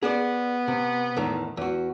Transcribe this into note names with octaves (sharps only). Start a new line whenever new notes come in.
B3 G#4 C5 D5
C3
E2 A2 D#3
E2 F#4